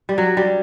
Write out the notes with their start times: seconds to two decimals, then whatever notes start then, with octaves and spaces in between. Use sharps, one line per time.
0.09 G3
0.18 F#3
0.37 G3